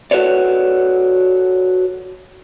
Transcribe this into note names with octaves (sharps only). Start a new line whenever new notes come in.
F#4 A4 B4 C#5 D5